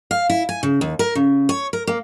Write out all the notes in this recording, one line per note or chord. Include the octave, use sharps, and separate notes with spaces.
F5
E4
G#5
C#3
D#2
A#4
C#3
C#5
A#4
A#3